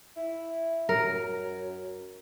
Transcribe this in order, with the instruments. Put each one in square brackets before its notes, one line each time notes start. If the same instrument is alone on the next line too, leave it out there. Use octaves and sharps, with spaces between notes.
[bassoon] E4
[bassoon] F#2 [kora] A#4